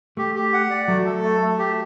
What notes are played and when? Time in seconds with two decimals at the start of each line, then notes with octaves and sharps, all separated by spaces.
0.17 A3 G4
0.35 G4
0.53 F#5
0.70 D5
0.88 F#3 A3
1.06 A4
1.23 A3
1.42 A3
1.59 G4